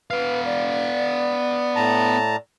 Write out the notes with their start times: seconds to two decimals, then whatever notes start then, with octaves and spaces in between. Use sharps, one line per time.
0.11 B3 B4 F5
0.45 D5
1.76 A2 A5 A#5